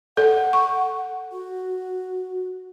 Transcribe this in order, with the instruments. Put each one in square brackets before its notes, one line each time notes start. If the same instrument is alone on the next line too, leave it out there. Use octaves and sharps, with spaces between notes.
[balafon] A4 [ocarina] F#5
[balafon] C#6
[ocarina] F#4